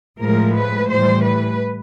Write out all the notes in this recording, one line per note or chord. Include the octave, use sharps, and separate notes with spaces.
A2 F3 G#3 A#4
B4
A2 E3 G3 C5
B4